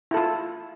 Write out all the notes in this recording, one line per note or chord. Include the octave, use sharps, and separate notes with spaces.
E4 F4 A4